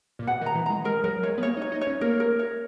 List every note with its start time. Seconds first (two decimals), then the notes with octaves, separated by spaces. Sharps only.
0.19 A#2
0.27 B2 F#5
0.41 D#3
0.46 A#5
0.55 E3
0.66 G#3 A#5
0.84 G#3 A#4
1.04 F#3 A#4
1.23 G#3 C#5
1.38 B3
1.43 A#3 C#5
1.57 D#4
1.62 C#5
1.72 D#4
1.81 C#5
1.87 C#4
2.01 A#3 A#4
2.20 A#4
2.39 C#5